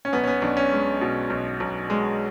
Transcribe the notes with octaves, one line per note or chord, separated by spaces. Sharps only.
C#4
B1 B3
C#4
B3
B1 D4
C#4
G#3
B2
B1
B1
G#3